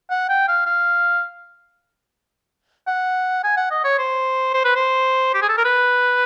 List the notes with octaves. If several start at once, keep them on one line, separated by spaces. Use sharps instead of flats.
F#5
G5
F5
F5
F#5
G#5
F#5
D#5
C#5
C5
C5
B4
C5
G4
G#4
A4
A#4
B4